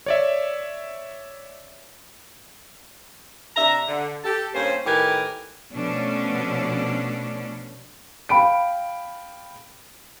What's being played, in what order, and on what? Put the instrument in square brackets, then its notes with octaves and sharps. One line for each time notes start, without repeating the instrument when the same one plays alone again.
[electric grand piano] C#5 D5 E5
[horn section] C3 D4 E5 A#5
D3
G4 A4 A5
G2 A#3 C#4 C5
A2 D#3 G4 A#4 B4 G#5
[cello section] B2 F3 A3 C#4 D4
[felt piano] F5 G5 B5 D7